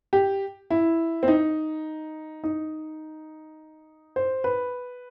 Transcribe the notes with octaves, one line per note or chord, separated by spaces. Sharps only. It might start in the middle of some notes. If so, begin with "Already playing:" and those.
G4
E4
C4
D#4
D#4
C5
B4